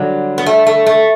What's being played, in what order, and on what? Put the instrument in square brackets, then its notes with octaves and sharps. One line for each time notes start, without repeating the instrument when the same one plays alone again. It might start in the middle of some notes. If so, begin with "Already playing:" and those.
Already playing: [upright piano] D3 G3 D4 [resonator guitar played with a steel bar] F#3
[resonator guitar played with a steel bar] B3
A3
A3
A3